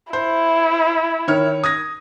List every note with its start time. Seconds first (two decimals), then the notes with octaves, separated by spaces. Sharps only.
0.13 E4 C5
1.28 D#3 C#5 F6
1.64 D#6 G#6 A#6